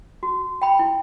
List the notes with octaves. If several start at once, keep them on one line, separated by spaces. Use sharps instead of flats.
F#4
G5 B5
E4